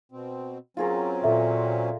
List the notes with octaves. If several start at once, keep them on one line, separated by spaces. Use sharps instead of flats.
B2 C4
F#3 C4 C#4 F4 G#4 A#4
A#2 A4 E5